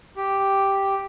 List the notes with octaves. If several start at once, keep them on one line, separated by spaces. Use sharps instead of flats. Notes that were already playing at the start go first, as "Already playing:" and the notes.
G4